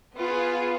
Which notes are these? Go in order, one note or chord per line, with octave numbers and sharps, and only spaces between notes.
B3 F4 G#4